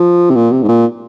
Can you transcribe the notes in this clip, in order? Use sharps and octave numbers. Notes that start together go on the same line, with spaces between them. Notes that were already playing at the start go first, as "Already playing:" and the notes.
Already playing: F3
C3
A#2
C3
G#2
A#2